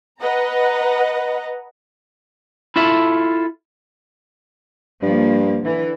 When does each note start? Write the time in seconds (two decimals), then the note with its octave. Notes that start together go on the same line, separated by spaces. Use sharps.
0.21 B4 D#5 F#5 A#5
2.76 E4 F4 A4 E5
5.03 G2 F3 A#3
5.60 D3 E3